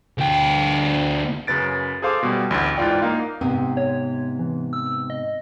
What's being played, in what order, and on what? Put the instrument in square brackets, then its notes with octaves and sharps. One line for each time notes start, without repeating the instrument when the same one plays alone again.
[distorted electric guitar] D2 G5
[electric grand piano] F#2 C#3 B4 A6 D7
G#4 A4 C5 F5 C6 D6
B2 G3
A1 D2
G#2 E3 F4 D5 G5
A#3 D#4 F5
[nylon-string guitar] G#2 C3 B3 [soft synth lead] C4
[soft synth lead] C#5
E3
E6
D#5